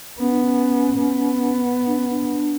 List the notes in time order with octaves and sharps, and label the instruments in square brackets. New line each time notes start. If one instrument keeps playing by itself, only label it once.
[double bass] B3 [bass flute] C#4
[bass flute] D4
C#4
[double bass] B3
[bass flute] D4
C#4
D4